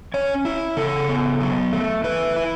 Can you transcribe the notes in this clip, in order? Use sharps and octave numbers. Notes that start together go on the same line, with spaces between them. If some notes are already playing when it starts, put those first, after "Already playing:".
C#4 C#5
E4
C#3 A4
B3
F#3
A3
E4 B4
E4